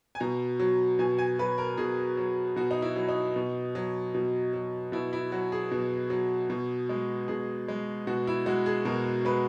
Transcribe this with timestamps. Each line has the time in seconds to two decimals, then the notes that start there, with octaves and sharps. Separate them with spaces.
0.15 G#5
0.20 B2 A#5
0.60 F#3
0.99 B2 G#5
1.18 G#5
1.39 F#3 B4
1.58 A#4
1.77 B2 G#4
2.17 F#3
2.56 B2 F#4
2.71 D#4
2.82 E4
2.96 F#3
3.09 D#4
3.36 B2
3.75 F#3
4.15 B2
4.53 F#3
4.92 B2 E4
5.13 E4
5.32 F#3 F#4
5.52 G#4
5.71 B2
6.10 F#3
6.50 B2
6.89 G#3
7.28 B2 G#4
7.68 G#3
8.07 B2 F#4
8.27 E4
8.46 G#3 F#4
8.66 G#4
8.85 B2 A#4
9.25 G#3 B4